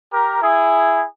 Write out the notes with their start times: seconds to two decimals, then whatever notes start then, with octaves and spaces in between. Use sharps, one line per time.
0.13 G4 A#4
0.42 E4 G#4